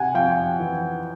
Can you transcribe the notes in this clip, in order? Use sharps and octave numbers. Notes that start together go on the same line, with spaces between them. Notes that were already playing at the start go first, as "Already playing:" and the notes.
Already playing: C3 F#5 G#5
F2 F5 G5
E3